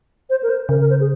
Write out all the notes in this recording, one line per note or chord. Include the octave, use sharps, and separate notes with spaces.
C5
A#4
C5
C#3 A#4
A#4
C5
G#4